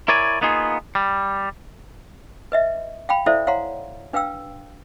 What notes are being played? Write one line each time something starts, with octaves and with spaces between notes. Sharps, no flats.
E4 A#4 C#5 D5 G#5
A#3 B3 D#4 F4 G#4
G3
B4 D#5 E5
F5 G5 B5
E4 A4 C5 D5 E5 F5
C#5 F5 F#5 A#5 C6
D4 B4 F5 G5 E6